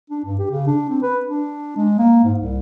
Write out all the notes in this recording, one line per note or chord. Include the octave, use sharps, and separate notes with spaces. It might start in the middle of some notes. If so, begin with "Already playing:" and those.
D4
G2
G4
C#3
D4
C4
B4
D4
G#3
A#3
G#2
C2